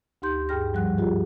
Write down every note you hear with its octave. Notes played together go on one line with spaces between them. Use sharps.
D2 D#4 G4 C6 G6
G2 G#4 G5 F6 A#6
G#2 F3 G3 F#5 F#6
F4 G4 G#4